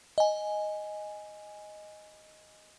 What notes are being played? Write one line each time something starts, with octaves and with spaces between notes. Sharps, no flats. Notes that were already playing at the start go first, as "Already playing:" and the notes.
D#5 G#5